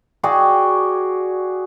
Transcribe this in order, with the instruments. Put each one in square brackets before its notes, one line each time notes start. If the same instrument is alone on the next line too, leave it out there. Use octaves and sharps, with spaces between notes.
[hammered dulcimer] F#4 G#4 D5 G5